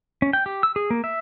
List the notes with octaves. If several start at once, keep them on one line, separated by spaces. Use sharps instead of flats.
C#4
G5
G4
E6
G#4
A#3
E5